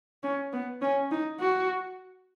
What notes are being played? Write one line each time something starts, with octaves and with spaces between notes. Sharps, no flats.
C#4
B3
C#4
D#4
F#4